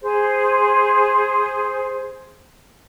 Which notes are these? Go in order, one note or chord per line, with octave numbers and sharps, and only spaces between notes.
G#4 C5